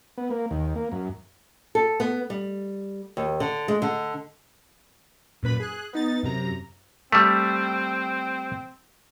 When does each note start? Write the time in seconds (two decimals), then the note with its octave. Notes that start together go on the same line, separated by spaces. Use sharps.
0.18 B3
0.30 A#3
0.51 D#2
0.75 A#3
0.92 F#2
1.75 A4
2.00 B3
2.30 G3
3.17 D#2
3.40 D3
3.68 G#3
3.82 D3
5.43 F#2 A#2 B4 B5
5.60 G#4 F#6
5.93 B3 D#4 A6
6.23 F#2 C3 A#5
7.12 G3 A3 C4